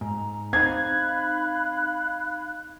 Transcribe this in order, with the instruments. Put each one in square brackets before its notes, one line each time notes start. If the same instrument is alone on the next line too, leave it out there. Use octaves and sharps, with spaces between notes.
[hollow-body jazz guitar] G#2 [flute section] A#5
[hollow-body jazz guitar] C4 D#4 [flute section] F5 B5 F#6 [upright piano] G#6